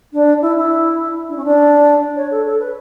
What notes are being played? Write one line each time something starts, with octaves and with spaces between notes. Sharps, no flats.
D4
E4
E4
D4
C#4
D4
C#5
A4
A4
B4